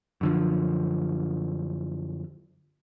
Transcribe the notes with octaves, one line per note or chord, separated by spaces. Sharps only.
F#2 D3 F3